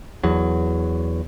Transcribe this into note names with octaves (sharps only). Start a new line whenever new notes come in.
E2 F#3